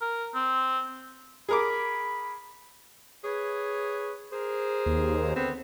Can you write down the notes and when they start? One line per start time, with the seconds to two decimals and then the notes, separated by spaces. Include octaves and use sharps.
0.01 A#4
0.35 C4
1.49 G#4 A#4 B5 D6
3.25 G#4 B4 C#5
4.32 G#4 A#4 C5
4.86 D#2
5.36 D3 B3 C4